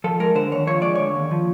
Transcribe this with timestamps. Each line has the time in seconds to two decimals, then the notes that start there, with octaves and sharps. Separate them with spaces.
0.04 F3 A4
0.20 G#3 A#4
0.35 D3 C5
0.51 D#2 C#5
0.67 F3 C#5
0.82 G#3 D5
0.95 D3 C#5
1.16 D#2
1.31 F3